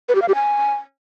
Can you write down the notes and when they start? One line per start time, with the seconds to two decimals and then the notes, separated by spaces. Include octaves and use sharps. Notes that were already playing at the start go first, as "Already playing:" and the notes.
0.09 B4
0.15 G4
0.22 F5
0.28 G4
0.35 G#5